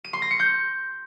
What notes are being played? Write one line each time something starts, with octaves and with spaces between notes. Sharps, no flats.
D#7
C6
A#6
C#7
G6